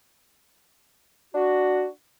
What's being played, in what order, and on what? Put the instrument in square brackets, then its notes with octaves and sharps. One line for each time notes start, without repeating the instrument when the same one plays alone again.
[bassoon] D4 [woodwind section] F#4